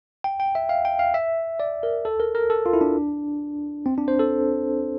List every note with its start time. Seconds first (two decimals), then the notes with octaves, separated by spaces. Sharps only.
0.24 G5
0.40 G5
0.55 E5
0.69 F5
0.85 G5
0.99 F5
1.14 E5
1.60 D5
1.83 A#4
2.05 A4
2.20 A#4
2.35 A#4
2.50 A4
2.66 F4
2.73 E4
2.81 D4
3.86 C4
3.98 D4
4.08 C5
4.19 A4